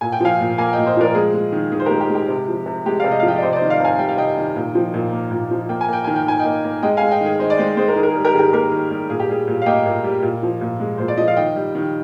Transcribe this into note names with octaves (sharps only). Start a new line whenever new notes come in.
A#2 G#5
G5
F3 F5 G#5
A#2
A#3 F5 G#5
D#5 G5
A#2
C5 D#5
F3 A#4 D5
G#3 G#4
G#3
D#3
D#3 G#4
C5
G4 A#4
G#3
G4
G#3
G4
C3
F3
C3
G#3 G4
D5 F5
C3
D#5
F3 F5
D#5 G5
D5
C3 C5 D#5
D5
C5 D#5
D#3
D5 F5
C3 F5 G#5
G3 G5
F5
C3 D#5 G5
D#3
A#2
F3
A#2
A#3
A#2
F3
A#3 G5
G#5
A#3 G5
D#3 G#5
G5
D#3 G#5
D#5 G5
A#3
A#3
G#3 D#5 G5
F5 G#5
G#3
D#5 G5
D#3
G#4
D#3 C5 D#5
D5
G#3 C5 D#5
G#3 G#4 C5
A#4
D#3 G#4
A#4
G#4
G3
G4 A#4
D#3 G4 G#4 A#4
A#3 G4 A#4
D#3
G3
A#2 G#4
G4
G3 G#4
A#2
F5
A#3 D#5 G5
A#2
G3
A#2
F3
A#2
G#3
A#2 C5
D5
F3 D#5
F5
D#3 D#5 G5
G3
D#3